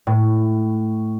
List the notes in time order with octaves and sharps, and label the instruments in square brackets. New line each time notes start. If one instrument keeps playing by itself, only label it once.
[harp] A2